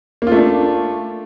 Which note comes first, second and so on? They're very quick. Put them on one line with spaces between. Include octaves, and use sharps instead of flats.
A#3 F4 A3 D4